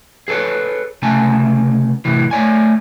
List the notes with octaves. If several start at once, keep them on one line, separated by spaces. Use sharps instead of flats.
G#4 A4 B4 C#5
C#2 C3 A3 C#4 G#5 A5
F#2 A2 C3 E3
A3 C#5 D5 G#5